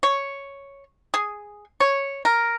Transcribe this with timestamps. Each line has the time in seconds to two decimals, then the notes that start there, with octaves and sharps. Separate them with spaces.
0.03 C#5
1.14 G#4
1.80 C#5
2.25 A#4